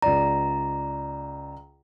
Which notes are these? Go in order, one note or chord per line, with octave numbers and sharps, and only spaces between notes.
C#2 D5 A#5